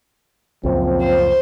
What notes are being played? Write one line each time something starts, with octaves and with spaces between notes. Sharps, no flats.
C#2 F#2 A#2 F3 C4
C5